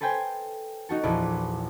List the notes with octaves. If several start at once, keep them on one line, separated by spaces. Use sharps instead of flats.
A4 B4 C5 G5 G#5
D#4 F#4 A4
A#1 E2 E4 D5